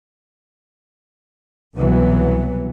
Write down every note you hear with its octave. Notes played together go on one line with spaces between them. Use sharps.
C2 B2 E3 F#3 B3